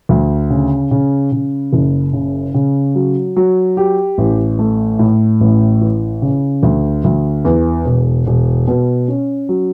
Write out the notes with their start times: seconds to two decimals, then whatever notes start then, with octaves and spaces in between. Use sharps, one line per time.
0.09 D2
0.50 C#3
0.91 C#3
1.32 C#3
1.73 F#1
2.13 C#3
2.54 C#3
2.95 F#3
3.36 F#3
3.77 G4
4.18 A1
4.59 A3
4.99 A2
5.41 A1
5.81 E3
6.22 C#3
6.63 D2
7.04 D2
7.45 E2
7.86 E1
8.27 E1
8.68 B2
9.08 C#4
9.49 F#3